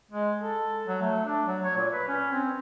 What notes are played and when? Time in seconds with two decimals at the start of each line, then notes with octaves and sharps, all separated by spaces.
0.11 G#3
0.40 A4
0.87 F#3
1.01 A3
1.26 D4
1.48 F#3
1.64 C#5
1.77 A#2
1.92 B4
2.08 C#4
2.32 C4